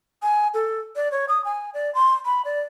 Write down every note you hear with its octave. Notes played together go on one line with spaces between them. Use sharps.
G#5
A4
D5
C#5
D#6
G#5
D5
C6
B5
D5